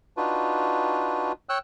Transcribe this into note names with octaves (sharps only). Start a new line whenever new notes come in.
D4 D#4 F4 F#4 B4
C#5 G5 E6 F#6